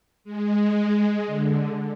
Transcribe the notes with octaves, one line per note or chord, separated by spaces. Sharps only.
G#3
D3